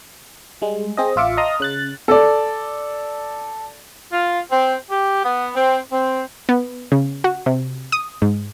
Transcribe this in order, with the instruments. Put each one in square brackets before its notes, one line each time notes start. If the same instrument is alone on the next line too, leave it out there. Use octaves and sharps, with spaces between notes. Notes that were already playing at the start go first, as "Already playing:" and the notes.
[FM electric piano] G3 G#3
C4 G#4 D#5
A1 F4 E5 D6 C#7
D#5 F5 A5 A#5 C6 D#6
C#3 F#6 A6
[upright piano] A4 D5
[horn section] F4
C4
G4
B3
C4
C4
[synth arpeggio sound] B3
C#3
F#4
C3
D#6
G#2